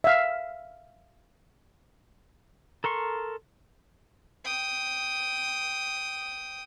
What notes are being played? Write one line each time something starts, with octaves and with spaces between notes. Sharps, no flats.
E5 F5
A4 A#4 C6 C#6
G5 D#6